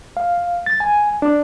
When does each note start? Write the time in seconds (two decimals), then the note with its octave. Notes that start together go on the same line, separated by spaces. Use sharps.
0.17 F5
0.66 A6
0.80 G#5
1.22 D4